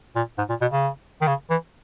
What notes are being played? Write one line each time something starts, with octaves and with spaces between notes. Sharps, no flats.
A#2
G#2
A#2
B2
C#3
D#3
C#3
E3